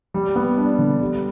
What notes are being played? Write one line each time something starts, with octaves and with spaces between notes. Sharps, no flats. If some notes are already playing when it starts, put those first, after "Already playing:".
G3
B3
D4
D3
G3